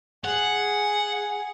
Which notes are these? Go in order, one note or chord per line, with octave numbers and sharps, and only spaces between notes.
G#4 F#5